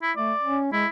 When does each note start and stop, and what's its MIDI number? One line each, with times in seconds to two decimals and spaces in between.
0.02 0.12 64
0.17 0.33 57
0.17 0.58 74
0.43 0.70 61
0.72 0.85 56
0.72 0.88 64